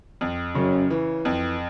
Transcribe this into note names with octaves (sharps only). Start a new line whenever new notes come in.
F2
F#2 C#3
E3
F2